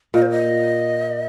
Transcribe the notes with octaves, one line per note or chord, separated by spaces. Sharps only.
A#2 D#5
C5
D#5